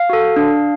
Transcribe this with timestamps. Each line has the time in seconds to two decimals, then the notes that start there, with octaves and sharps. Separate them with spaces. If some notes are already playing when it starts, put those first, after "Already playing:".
Already playing: F5
0.10 F#4 A4
0.36 D4